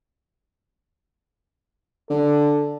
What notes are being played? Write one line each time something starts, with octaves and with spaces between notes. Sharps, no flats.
D3 A4